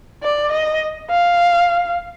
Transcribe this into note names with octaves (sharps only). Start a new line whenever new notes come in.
D5
D#5
F5